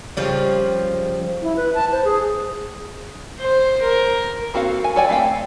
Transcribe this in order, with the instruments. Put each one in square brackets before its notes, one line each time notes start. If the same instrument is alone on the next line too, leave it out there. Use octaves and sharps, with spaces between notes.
[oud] C#3 F3 G3
[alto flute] E4
B4
A5
C5
G#4
[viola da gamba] C5
A#4
[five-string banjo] A#3 C4 F#4 A4 F5
G#5
A4 C#5 D5 G5 G#5
A3 C4 F5 G5